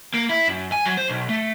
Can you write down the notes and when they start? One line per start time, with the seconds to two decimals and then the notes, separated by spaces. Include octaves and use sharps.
0.14 A#3
0.29 E4
0.48 F#2
0.72 G#5
0.86 F#3
0.97 C5
1.09 B1
1.29 A3